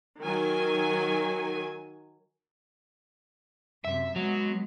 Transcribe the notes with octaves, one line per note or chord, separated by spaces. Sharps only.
D#3 F#3 G#5
F#2 C3 E5
F#3 G#3 B3